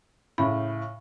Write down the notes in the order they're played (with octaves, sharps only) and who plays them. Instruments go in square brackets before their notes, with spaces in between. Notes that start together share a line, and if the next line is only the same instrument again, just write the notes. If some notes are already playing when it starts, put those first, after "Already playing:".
[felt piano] A2 C#3 [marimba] B5